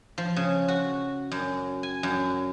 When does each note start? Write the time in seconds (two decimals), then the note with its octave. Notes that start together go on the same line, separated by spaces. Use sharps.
0.18 F3
0.36 C#3
0.68 F#4
1.31 F#2
1.83 G#5
2.03 F#2